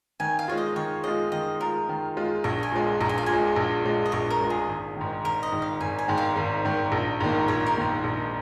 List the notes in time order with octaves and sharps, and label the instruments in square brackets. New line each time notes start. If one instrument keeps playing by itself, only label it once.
[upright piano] D#3 [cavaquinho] G#5
[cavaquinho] F5
[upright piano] G#3 F4 [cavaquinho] C#5
[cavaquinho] D#5
[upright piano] D#3 [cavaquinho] C#5
[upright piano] G#3 F4 [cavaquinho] D#5
[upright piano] D#3 [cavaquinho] D#5
[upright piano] G#3 F4 [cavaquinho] A#4
[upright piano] D#3
G#3 F4
[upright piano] A#1 [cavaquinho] C#5
[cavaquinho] G#5
[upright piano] A#2 G#3
[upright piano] A#1 [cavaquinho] A#5
[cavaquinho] G#5
F5
[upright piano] A#2 [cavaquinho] G#5
[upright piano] G#3
A#1
A#2 G#3
[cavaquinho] D#5
[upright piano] A#1 [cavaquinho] C#5
[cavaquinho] A#4
[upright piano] A#2 G#3
[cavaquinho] G#4
[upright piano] G#1
G#2 D#3
[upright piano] G#1 [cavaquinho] A#4
[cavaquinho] D#5
[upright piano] G#2 D#3
[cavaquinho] F5
[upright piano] G#1 [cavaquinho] G#5
[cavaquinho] G#5
[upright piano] G#2 D#3
[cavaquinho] F5
[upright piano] G#1
G#2 D#3
A#1
G#2 D#3 A#3
[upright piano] A#1 [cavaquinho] C#5
[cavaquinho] A#4
[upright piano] G#2 D#3 A#3
A#1